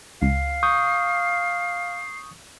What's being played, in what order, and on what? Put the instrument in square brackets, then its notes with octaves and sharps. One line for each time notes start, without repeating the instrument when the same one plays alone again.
[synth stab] C#2 [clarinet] F5 [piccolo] C7
[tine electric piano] C#6 D#6 G6